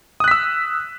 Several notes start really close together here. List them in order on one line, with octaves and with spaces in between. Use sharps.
D#6 F#6 B6 E6